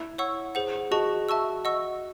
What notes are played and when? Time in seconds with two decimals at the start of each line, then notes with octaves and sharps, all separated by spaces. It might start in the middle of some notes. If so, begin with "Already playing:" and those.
Already playing: E4
0.18 C#5 F#5 C#6 E6
0.55 G#4 C5 F#5
0.91 F#4 G#4 D#5 A5 C#6
1.29 E5 A5 C#6 E6
1.65 D#5 F#5 C#6 E6